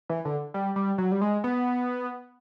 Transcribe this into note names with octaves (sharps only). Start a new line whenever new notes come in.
E3
D3
G3
G3
F#3
G3
G#3
B3